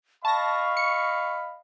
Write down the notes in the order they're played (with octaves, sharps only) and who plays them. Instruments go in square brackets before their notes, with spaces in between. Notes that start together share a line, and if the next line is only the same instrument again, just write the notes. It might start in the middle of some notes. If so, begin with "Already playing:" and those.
[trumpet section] D#5 F5 B5 [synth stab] A5 A#6 [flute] C#6
[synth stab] C#7